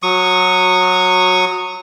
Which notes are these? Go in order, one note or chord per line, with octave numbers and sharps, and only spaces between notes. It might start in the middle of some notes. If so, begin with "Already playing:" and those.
F#3 C#6 D#6